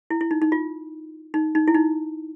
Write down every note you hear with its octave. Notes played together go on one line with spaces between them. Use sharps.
E4
E4
D#4
D#4
F4
D#4
D#4
E4
D#4